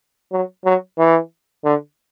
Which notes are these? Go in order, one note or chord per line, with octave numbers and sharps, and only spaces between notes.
F#3
F#3
E3
D3